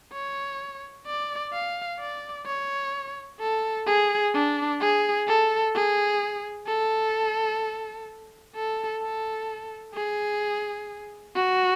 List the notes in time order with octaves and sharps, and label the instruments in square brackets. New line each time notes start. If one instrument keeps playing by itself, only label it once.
[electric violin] C#5
D5
F5
D5
C#5
A4
G#4
D4
G#4
A4
G#4
A4
A4
A4
G#4
F#4